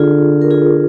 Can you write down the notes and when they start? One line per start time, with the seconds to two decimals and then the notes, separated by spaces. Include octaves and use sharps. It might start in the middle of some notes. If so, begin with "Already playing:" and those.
Already playing: D3 F4 G#4
0.41 A#4
0.51 F4 G#4